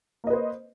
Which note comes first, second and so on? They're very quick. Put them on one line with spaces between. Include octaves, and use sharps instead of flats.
A#3 D#5 B4 C5